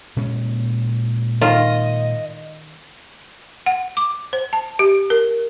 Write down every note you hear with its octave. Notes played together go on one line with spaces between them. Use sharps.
A#2 G#3 C#4
D#3 F4 D#5
F#5
D6
C5
A5
G4
A#4